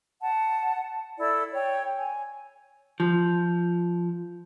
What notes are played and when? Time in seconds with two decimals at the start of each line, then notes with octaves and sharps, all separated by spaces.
0.20 F#5 A5
1.19 E4 A4 D5 E6
1.52 C#5 G5
1.97 G#5
3.00 F3